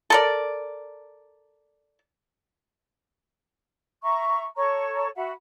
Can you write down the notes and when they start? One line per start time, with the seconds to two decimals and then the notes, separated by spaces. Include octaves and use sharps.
0.10 A4 A#4 D5
4.02 E5 A#5 C#6
4.55 A4 C#5 A#5 C#6
5.15 F#4 E5 F#5 B5